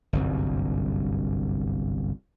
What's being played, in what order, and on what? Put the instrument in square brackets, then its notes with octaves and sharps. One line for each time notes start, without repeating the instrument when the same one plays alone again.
[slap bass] G1 C2 F#2